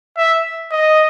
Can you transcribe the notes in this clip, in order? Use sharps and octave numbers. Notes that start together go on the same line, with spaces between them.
E5
D#5